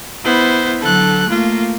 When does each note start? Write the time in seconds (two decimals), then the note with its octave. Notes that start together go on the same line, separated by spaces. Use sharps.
0.25 B3 E4 C5
0.81 D3 F#3 A4 F#6
1.30 A3 A#3 F4